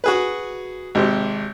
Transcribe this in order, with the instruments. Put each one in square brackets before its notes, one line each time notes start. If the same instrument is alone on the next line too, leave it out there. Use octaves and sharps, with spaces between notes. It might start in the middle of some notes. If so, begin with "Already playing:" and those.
[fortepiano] F#4 G#4 B4
G#1 C3 G4